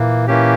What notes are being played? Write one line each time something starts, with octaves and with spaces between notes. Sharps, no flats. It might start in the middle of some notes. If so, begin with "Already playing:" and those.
Already playing: A#2 E3 A#3
E3 A#3 C#4 G4